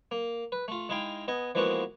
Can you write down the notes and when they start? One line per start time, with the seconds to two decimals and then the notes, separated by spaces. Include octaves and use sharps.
0.11 A#3
0.52 B4
0.68 A3 F4
0.89 G#3 D#4 E4 F5 G5
1.28 B3 D#5 G#5
1.55 E3 F3 G#3 A#3 B3 F#4